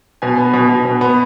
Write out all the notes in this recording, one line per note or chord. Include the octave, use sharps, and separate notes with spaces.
B2 G#5
B3
B2
B2
B2
B3